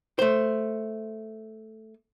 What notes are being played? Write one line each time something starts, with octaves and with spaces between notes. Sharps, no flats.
A3 C5